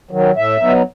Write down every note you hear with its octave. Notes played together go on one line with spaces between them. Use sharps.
D#3 F#3
A2 E5
F#3 B3 D#4